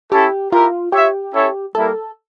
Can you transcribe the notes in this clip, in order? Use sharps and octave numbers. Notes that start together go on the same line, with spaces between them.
C#4 E4 G4 A4
E4 F4 G4 A#4
F4 G4 C#5 E5
C#4 E4 A4 C#5 E5
G3 A#3 E4 A4 A#4